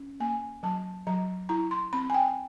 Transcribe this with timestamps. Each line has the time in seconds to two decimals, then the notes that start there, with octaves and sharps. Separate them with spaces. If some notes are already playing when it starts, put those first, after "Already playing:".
Already playing: C#4
0.20 A#3 G#5
0.63 F#3 A5
1.07 F#3 A#5
1.49 E4 A#5
1.71 C6
1.93 C4 B5
2.10 G#5
2.14 G5